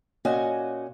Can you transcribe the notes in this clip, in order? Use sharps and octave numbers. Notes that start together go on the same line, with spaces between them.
A#2 C#4 F#4 D#5 G#5